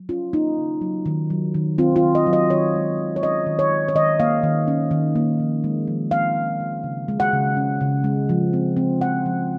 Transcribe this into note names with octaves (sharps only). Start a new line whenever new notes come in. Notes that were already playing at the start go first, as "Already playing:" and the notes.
Already playing: F#3
C#4 F4
A#3 D#4
C#3
F#3
D#3
F#3
D#3
C4 F4
F4
D#3
D#5
F#3
D#5
D#3 C#5
G#3
D#3
C#5
C#4 D#5
D#3
C#5
G#3
C#5
D#3 D#5
A#3 F5
D#3
C#4
D#3
A#3
F3
G#3
F3
C4 F5
F3
G#3
C#3
G#3
F#5
C#3
C#4
C#3
G#3
F3
C4
C4
F3 F#5
F3